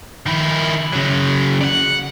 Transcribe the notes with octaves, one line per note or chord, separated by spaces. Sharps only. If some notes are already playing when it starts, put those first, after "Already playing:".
D#3 E4
C#3 F#3
D5 F#5